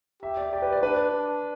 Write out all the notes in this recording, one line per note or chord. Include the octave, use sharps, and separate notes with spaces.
G4 E5
D5
G4 D5
B4
D5
D4 B4
D4